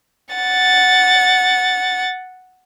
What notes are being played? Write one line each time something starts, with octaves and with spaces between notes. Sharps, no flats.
F#5 A6